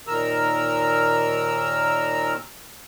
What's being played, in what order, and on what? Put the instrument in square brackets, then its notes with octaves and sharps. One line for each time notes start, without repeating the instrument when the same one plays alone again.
[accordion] D#2 A#2 D#3 A#4 A#5 E6